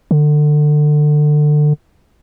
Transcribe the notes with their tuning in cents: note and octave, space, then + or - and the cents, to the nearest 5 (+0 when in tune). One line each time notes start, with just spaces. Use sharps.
D3 +25